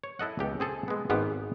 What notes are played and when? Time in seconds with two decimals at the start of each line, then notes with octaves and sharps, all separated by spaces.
0.04 C#5
0.19 E4 A4 D#5 F#5
0.39 C#2 B3 G4
0.60 C4 G#4 A4
0.88 G#3 B3
1.10 G#1 G#2 B3 G4